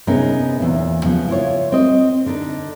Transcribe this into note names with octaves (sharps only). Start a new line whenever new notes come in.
C3 B3 C#4 D#4 G#4 A#4
E2 A#2
C#3 F3 B3
E4 F4 C#5
C4 D#5
D3 D4 D#4